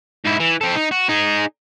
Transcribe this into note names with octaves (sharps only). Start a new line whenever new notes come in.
G#2 E4
E3
C4 A4
D#4
F#4
D#4 G#4